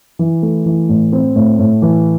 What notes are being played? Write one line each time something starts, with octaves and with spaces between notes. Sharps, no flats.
E3
A3
E3
A2
C4
A2
A2
E3